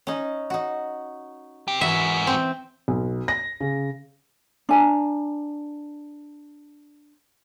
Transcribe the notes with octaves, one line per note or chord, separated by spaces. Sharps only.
C#4 D#4
D#4 F#4
C4 G4
G#2 E3 F#4 E5
C4
B1
A#6
C#3
D4 G#5 A#5